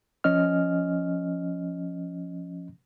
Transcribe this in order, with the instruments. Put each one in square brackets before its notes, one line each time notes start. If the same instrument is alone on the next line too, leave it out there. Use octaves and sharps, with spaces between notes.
[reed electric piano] F3 C#4 D#5 F6